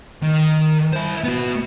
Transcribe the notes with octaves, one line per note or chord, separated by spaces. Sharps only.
D#3
E4 C5
B3 F#4